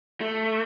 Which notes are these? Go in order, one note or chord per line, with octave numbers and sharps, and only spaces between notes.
A3